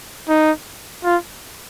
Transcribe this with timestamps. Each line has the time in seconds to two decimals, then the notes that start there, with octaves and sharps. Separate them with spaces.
0.28 D#4
1.04 F4